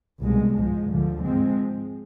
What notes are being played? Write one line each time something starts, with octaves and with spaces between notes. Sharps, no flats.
C2 B2 G#3
G#2 F3 G#3
D2 D3 F3
G#2 F3 G#3 C4